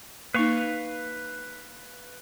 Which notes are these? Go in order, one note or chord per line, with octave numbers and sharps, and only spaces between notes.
A#3 D#4 B4 F5 C#6